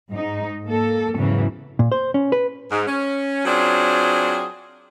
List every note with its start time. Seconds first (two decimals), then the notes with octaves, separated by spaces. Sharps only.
0.10 G#2 D#4
0.65 A#3 A4
1.14 E2 G#2 C#3 E3 F#3
1.79 A#2
1.92 C5
2.14 C#4
2.32 B4
2.71 G#2
2.87 C#4
3.45 F#3 C4 D4 F4 G#4 C5